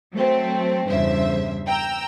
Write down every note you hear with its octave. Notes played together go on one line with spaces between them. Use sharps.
F#3 A3 C4
E2 G2 C#3 C5 E5
G5 A#5 E6